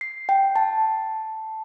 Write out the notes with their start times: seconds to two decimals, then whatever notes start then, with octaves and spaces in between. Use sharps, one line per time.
0.01 C7
0.29 G5
0.56 A5